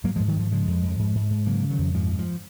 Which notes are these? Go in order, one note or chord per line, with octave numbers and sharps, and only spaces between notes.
G#2 F#3 A#3
F3 G#3
G#2
D#3 F#3
G#2 F3
C#3 F3 G#3
F2
F2
G#2
G#2
G#2
C#3 F#3 A#3
C#3
D#3 F#3
F2
G#2 F3
G#2
F3